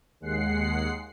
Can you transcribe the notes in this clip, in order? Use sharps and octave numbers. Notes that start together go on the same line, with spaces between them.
D#2 G#3 F#5 C7